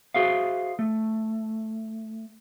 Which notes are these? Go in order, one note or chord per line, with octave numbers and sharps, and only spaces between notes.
F#4 G#4 C5 E5 F5
A3